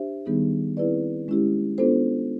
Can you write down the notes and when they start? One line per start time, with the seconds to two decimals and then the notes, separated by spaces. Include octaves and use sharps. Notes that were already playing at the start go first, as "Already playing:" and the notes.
Already playing: D4 G4 C5 E5
0.26 D#3 G3 B3 D#4 G#4
0.77 C4 E4 G#4 B4 D5
1.28 G#3 C#4 E4 G4
1.78 B3 D4 F4 A4 C5